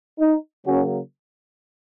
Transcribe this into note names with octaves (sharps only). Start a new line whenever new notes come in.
D#4
C#3 F#3 A#3 C#4 F#4